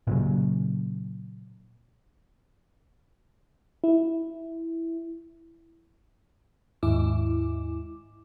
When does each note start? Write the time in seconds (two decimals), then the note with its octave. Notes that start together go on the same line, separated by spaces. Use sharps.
0.07 A#2 C#3 F#3
3.84 E4
6.83 D#2 G#2 E4 D6